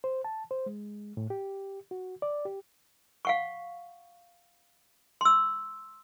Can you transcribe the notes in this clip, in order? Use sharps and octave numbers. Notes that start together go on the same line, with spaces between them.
C5
A5
C5
G#3
A2
G4
F#4
D5
G4
F5 F#5 C#6
C6 E6